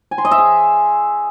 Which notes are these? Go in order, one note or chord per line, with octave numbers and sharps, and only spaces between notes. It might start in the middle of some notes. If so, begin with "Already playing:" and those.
G#5
C6
D#5
E5
G#4